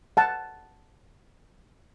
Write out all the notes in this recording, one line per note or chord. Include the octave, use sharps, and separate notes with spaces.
F#5 A5